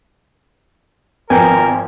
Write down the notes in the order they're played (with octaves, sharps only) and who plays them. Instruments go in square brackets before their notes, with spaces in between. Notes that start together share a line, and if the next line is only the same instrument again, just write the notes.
[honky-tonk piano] G#1 F3 [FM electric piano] B3 [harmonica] A#4 [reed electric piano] G5 G#5